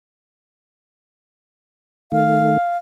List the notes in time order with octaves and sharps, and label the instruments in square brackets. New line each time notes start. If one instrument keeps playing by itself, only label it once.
[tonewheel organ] D#3 A3 [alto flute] F5